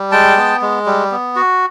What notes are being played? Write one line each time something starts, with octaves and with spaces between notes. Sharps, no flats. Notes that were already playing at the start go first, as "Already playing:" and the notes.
Already playing: G3
G#3 G5 A5
B3
G#3
G3
B3
F#4